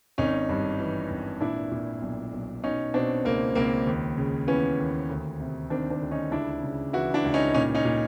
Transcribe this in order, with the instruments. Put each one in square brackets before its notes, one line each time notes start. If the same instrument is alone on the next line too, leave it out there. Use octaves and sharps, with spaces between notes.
[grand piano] G#1 C#4 D#4
G2
E3
G#1
A#2 D4 E4
A#2
B1
B1
B2 C#4 D#4
B2 C4 D4
C#2 A#3 C4
C#2 A#3 C4
D#2
C#3
E3 B3 C#4
D#2
D2
C3
D#3 C4 D4
C4 D4
D2
C#4 D#4
C#2 D4 E4
C#3
E3 E4 F#4
D4 E4
C#2
C#4 D#4
A#2 C#4 D#4
C#4 D#4
A#2